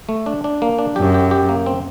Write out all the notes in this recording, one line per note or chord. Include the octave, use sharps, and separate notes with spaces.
A3
D4
D4
A#3
D4
F#2 G4
G4
G4
A#3
C4